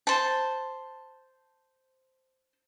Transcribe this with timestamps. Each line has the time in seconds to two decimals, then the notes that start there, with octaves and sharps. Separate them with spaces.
0.07 C5 A5